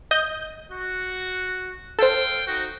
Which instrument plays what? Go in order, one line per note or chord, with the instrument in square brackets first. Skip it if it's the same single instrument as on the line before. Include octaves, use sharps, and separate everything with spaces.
[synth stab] D#5 G6
[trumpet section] F#4
[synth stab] A4 C5 [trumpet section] F5 G5
[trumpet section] D#4 F#4